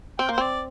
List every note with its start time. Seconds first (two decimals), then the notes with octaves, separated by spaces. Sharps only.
0.18 C4 G5
0.29 A#3 C5
0.38 C4 D5